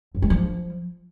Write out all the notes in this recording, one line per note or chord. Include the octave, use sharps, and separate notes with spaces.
F#2
G#3
F3